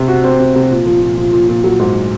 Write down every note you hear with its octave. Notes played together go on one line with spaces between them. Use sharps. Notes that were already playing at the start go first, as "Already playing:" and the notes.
Already playing: C3 C4
F#4
C4
C3
C3
A#2
F3
A#2
F3
A#2
A#2
F#3
G#2